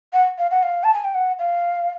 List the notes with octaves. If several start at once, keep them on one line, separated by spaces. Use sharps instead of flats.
F#5
F5
F#5
F5
A5
G#5
G5
F#5
F5